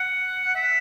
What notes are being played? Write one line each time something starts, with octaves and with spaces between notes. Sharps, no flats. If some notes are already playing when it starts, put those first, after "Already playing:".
Already playing: F#5
E5